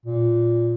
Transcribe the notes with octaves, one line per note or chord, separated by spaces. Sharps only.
A#2